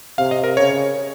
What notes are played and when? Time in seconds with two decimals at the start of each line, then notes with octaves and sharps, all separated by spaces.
0.18 C3 F5
0.31 D#5
0.44 A#4
0.57 C#3 C#5